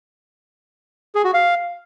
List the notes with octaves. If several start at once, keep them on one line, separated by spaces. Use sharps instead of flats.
G#4
F#4
F5